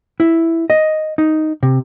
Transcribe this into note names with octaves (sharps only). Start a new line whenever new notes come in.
E4
D#5
D#4
C3